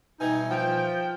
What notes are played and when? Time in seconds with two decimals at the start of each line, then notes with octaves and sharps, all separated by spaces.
0.20 B2 E3 G3 D#4 G#5
0.50 F3 G5